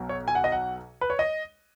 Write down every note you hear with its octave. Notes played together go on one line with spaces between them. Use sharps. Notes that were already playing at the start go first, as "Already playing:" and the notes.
Already playing: B1 B2 F#3
C#5
G#5
F#5
D#5
F#5
B4
C#5
D#5